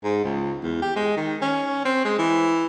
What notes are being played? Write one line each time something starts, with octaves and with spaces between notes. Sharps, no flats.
G#2
C#2
E2
G4
G#3
D#3
C#4
C4
G#3
E3